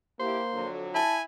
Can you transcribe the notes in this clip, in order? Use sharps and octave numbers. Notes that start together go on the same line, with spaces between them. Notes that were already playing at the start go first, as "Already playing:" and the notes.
A#3 E4 G4 C5
F2 D3 F#3
E4 G#5 A5